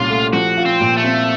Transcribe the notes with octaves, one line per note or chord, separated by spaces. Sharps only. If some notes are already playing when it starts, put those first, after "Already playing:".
Already playing: C2 A#2 C#4 F4
A3
F3 F#4
F4
C4
A#2
A3
C4